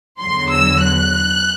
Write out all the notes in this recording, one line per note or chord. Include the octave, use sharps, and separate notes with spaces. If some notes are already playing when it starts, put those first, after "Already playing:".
E2 D3 F#3 C6
E6
F#6